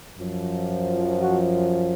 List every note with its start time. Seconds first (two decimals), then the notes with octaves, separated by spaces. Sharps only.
0.17 F#2 F3
1.21 F#4